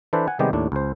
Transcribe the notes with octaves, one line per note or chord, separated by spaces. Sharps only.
E3 D4 A4 B4 C5
F#5 G#5
C3 D#3 G3 G#3 B3 G4
D#2 A2 D4
C#2 C5